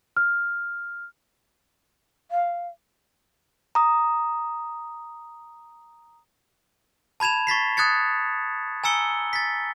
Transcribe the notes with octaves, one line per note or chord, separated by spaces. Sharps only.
F6
F5
A#5 D#6
A5 B5 G#6 E7 F7
C#6 A6 B6 C7
D#6 F#6 G#6 A6 C#7
G#5 A#5 E6 C#7 G7
A6 B6